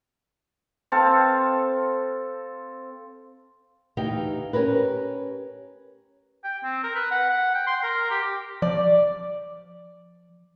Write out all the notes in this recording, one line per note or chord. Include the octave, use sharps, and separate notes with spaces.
C4 A4 F5
D2 E3 D#4 G4 F5 G5
C#4 G4 A#4 B4
G5
C4
A#4
B4
F#5
F#5
G5
C6
A#4
G4
F3 D5